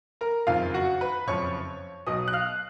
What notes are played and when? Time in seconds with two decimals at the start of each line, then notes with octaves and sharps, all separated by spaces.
0.21 A#4 A#5
0.47 F#1 F2 D#3 F4 F5
0.74 F#4 F#5
1.01 B4 B5
1.27 F#1 F2 F3 C#5 C#6
2.07 B1 B2 D#5 D#6
2.28 F#6
2.33 F5 F6